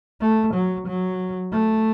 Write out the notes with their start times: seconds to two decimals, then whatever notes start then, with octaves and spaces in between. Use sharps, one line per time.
0.21 A3
0.54 F#3
0.87 F#3
1.53 A3